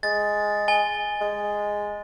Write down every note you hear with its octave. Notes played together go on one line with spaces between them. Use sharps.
G#3 A6
G#5 G7
G#3